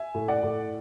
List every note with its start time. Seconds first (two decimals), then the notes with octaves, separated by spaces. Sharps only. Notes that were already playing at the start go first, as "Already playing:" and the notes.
Already playing: E5 G#5
0.15 A2
0.28 D5 F#5
0.43 A2